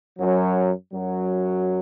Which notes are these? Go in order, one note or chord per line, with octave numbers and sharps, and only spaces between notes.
F#2 F#3
F#2 F#3